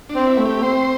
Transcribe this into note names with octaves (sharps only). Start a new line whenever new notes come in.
D4
C4
E4
A3
G4
C4 C5